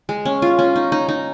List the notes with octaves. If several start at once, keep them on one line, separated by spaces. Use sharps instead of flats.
G#3
C#4
F4
C#4
D#4
D#4
D#4